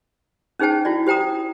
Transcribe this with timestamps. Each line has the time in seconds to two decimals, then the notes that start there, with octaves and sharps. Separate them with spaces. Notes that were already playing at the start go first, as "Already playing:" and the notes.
0.59 C#4 D#4 G#4 C5 G5 A5
0.85 E4 F#4 D5
1.07 G4 C5 G5 A#5 D#6